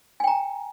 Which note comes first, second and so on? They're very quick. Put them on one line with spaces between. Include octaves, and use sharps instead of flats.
G#5 G5 A#5